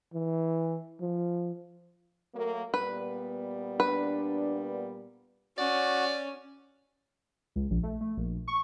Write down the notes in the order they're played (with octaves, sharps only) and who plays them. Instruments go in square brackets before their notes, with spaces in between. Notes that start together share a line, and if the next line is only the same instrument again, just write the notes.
[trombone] E3
F3
[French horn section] F#3 A3 A#3
[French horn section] A#2 G3 B3 [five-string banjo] B4
[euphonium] D4 [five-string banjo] B4
[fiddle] C#4 [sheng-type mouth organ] F#4 [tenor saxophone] D5
[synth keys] C#2
A#1
A3
A3
A#1
C#6